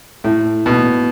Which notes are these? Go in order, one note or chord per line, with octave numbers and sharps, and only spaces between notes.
A2
B2